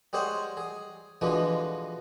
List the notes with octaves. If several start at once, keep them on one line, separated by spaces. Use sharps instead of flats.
G3 G#3 G#4 C5 C#5 F#5
G#4
B2 D3 E3 F3 G#3 B3